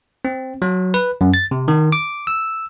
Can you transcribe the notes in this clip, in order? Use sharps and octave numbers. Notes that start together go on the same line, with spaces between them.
C4
F#3
B4
F#2
A6
C3
D#3
D6
E6